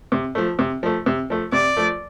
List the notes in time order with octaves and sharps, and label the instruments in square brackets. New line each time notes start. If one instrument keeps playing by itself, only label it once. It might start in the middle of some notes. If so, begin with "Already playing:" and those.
[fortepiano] C3
F3 A3
C3
F3 A3
C3
F3 A3
[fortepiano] C3 [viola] D5
[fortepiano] F3 A3